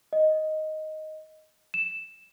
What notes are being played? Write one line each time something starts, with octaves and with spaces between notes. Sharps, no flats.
D#5
E7